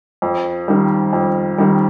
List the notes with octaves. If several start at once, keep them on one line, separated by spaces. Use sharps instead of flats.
F2
D#3 G3
F2
D#3 G3